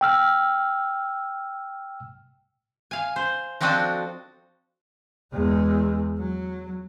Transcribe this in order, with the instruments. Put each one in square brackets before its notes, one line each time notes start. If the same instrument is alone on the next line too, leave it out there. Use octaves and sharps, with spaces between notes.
[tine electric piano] G5 E6 F6
[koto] F5 G#5
C5
F3 C4 D4 F#4 A4 D#5
[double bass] E2 G#3
F#3